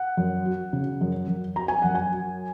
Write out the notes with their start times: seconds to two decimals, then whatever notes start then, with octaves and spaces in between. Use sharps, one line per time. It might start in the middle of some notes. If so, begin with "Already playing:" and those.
Already playing: F#5
0.17 F#2
0.45 F#3
0.73 C#3
1.01 F#2
1.28 F#2
1.56 F#3 A#5
1.68 G#5
1.82 F#2 F#5
1.95 G#5
2.12 F#3